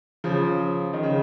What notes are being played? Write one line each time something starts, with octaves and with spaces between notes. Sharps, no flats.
C#3 F3
D#3
C#3